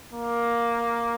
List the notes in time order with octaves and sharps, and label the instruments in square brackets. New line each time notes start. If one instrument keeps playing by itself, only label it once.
[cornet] A#3